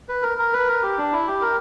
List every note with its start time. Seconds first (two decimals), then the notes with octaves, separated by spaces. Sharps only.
0.09 B4
0.22 A#4
0.38 A#4
0.53 B4
0.68 A#4
0.83 G4
0.98 D4
1.13 E4
1.27 G4
1.41 A#4